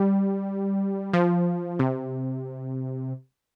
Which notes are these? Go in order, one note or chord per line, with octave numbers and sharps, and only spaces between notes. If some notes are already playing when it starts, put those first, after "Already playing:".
Already playing: G3
F3
C3